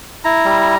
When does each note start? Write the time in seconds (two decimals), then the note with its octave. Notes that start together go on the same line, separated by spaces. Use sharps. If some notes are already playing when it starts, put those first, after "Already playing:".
0.24 E4 A#5
0.45 G3